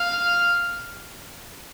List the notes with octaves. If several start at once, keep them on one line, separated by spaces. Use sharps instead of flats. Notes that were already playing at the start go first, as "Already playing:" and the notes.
Already playing: F5